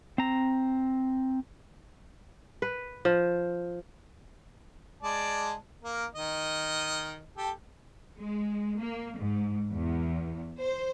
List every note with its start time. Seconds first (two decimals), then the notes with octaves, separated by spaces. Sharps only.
0.18 C4 A#5
2.62 B4
3.05 F3
5.03 G#3 D5 A5
5.84 A#3 A#4
6.15 D#3 D#5
7.37 G4 A4
8.18 G#3
8.79 A#3
9.19 G#2
9.72 E2
10.60 C5